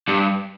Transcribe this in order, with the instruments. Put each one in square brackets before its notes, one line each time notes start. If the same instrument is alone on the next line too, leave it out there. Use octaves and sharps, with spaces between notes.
[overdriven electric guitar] G2